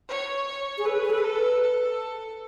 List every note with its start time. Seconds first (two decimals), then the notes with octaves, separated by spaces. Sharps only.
0.09 C#5
0.47 C#5
0.78 G#4
0.85 A4 B4
1.05 G#4
1.10 A4
1.24 A4
1.36 B4
1.63 A4